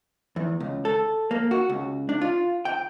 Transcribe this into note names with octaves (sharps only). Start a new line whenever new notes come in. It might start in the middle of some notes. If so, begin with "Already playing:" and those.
E2
C#2
A4
A#3
F#4
C#2
D4
F4
G5